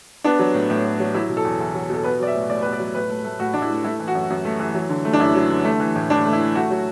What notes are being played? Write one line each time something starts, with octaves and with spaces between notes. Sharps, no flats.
B3 D4
F#3
A2
A2
B3
F#3
F#3 E4
B2
A4
E2
E2
F#3
B2 A4
B3 B4
F#3 D5
E5
A2
A2 D5
B3 B4
D5
F#3
A2 B4
A3
A3
A2 F#4
A2 D4
E4
A3
A3 E4
E3
F#4
F#2
F#2
A3
E3
F#3
D3
A3
D4
F#2 E4
F#3
D3
A3
E3
A2
A2 D4
A3
E4
E3
A3 F#4
F#3